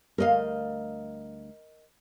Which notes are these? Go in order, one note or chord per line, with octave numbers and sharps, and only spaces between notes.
D2 G3 A#4 D#5 F5